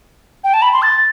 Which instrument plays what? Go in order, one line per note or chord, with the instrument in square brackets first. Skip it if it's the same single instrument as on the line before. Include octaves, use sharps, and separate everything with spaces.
[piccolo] G5
A5
B5
C6
A6